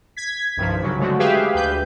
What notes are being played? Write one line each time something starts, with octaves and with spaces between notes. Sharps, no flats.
G#6 B6
C2 G2 D#3 F3
C#3 F#3
D3 G#3 A3 F#4
G4 G#4 B4 E5 F5 G5
D2 B4 G6